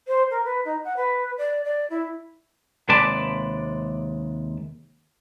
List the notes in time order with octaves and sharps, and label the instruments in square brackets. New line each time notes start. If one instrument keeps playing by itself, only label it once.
[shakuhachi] C5
A#4
B4
D#4
F#5
B4
D5
D5
E4
[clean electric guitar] D#2 C3 G#3 B4 D5 A5